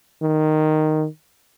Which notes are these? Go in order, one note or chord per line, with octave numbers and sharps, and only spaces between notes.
D#3